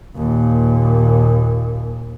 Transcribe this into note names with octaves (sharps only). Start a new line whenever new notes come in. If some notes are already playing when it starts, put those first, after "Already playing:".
D#2 A#2